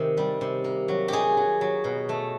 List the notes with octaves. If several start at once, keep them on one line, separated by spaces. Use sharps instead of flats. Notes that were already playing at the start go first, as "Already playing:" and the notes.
Already playing: C3 D#3
G3
C3
A#3
F#3
D#4 G4 G#4
F#3
F#3
B2
A3